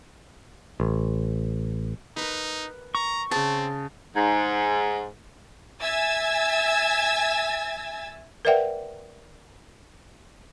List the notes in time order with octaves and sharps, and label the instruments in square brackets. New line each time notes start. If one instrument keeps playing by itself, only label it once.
[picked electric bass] A1
[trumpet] D#4 [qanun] A#4 B4
[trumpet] A#5 [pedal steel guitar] C#6
[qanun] C#3 G#4 [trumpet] C4 [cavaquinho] A5
[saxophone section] G#2
[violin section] E5 G#5 E6 G#6 A6
[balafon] A#4 B4 D5 E5 F#5 G5